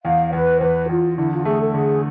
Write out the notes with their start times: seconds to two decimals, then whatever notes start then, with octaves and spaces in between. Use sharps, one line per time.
0.04 E2 F5
0.32 E2 B4
0.57 C5
0.60 E2 B4
0.89 E2 F4
1.17 D3 E4
1.32 F4
1.45 A3 G#4
1.61 A4
1.74 D3 G#4